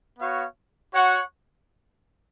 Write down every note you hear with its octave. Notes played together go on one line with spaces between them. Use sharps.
B3 F#4 C#5 F5
F#4 C#5 F#5